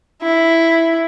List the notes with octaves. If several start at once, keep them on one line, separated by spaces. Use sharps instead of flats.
E4